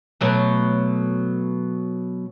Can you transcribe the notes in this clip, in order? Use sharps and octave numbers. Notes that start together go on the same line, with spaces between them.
B2 F#3 A3